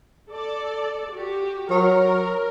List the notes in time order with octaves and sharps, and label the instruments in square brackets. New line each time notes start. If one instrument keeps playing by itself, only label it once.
[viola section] A4 D5
F#4 G4
[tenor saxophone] F#3 [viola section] A#4